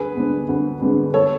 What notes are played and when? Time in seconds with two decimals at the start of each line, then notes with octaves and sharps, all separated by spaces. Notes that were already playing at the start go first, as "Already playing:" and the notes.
Already playing: D2 G#4 B4
0.15 D3 G#3 B3 D4
0.49 D2
0.82 D3 G#3 B3 D4
1.14 A4 C#5